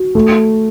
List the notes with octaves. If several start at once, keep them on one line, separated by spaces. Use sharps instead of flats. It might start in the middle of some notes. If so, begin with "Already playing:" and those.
Already playing: F#4
A3